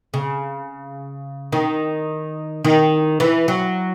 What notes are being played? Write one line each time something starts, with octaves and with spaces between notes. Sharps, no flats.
C#3
D#3
D#3
E3
F#3